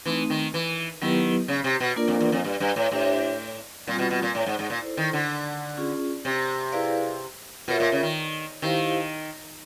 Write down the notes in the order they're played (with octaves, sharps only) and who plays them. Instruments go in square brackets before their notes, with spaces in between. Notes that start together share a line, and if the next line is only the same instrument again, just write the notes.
[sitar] E3 [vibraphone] A3 C4 D#4
[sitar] D#3
E3
[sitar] D#3 [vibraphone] F#3 B3 E4 G4 B4
[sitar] C#3
C3
B2
[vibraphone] A#3 D4 F4 A#4 D5
[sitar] F2
E2
F2
G2
G2
A2
[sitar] A2 [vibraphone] D4 G4 C5 E5
[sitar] A#2 [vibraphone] G3 C4 F4
[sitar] B2
B2
A#2
A2
G#2
G#2
A#2
[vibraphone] E4 A4 C5
[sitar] D#3
D3
[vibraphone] C#4 F4 G#4
[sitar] C3
[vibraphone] E4 G#4 B4 D5 F5
[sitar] B2 [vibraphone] F4 A#4 C#5 E5
[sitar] A#2
C#3
D#3
[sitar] D#3 [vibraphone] E4 G4 C5 F5